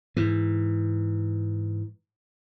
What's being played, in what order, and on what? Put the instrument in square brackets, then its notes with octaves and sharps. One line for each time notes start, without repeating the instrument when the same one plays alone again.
[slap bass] G#2 E3